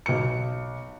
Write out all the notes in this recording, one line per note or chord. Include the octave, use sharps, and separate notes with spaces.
B1 C#7